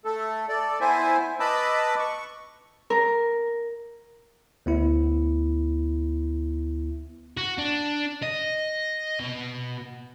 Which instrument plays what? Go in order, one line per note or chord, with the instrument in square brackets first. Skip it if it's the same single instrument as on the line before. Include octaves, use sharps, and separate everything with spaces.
[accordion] A3 A4
A4 D5
B3 E4 C5 E5 G#5
B4 D#5 A5 B5 D6 E6
C#6
[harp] A#4
[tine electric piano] D2 B3 E4
[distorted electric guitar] F#4
D4
D#5
B2